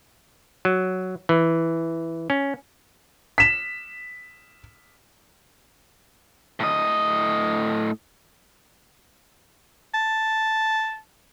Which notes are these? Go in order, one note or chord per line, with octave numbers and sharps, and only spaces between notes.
F#3
E3
C#4
B6 E7
A2 D#5
A5